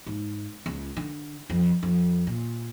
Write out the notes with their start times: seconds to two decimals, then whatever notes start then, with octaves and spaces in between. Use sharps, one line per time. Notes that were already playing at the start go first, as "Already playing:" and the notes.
0.06 G#2
0.66 C#2
0.97 D3
1.50 F2
1.83 F2
2.27 A#2